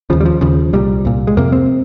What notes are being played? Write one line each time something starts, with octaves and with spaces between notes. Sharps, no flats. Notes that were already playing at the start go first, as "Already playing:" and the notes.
D#2 C#3 F3
G3
F3
D#2 C#3 F3
C2 A#2 G3
C2 A#2
G#3
F2 C3 A#3
C4